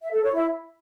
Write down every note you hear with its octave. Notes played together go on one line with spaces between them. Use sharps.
E5
A4
C#5
E4